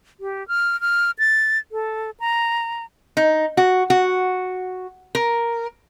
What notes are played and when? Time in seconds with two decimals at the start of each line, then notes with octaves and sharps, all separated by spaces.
0.20 G4
0.48 F6
0.81 F6
1.19 A6
1.72 A4
2.20 A#5
3.17 D#4
3.57 F#4
3.90 F#4
5.15 A#4